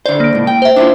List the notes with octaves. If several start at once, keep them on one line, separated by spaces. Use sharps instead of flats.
D3 C5 D5
A#3 D7
C#2 A2
G5
C5 E5
D4 E4 F4